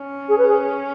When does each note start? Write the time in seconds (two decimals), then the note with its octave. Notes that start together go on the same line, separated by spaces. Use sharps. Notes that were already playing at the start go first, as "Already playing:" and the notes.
Already playing: C#4
0.29 G#4
0.38 B4
0.48 G#4